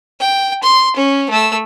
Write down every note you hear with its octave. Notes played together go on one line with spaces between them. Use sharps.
G5
C6
C#4
A3 E6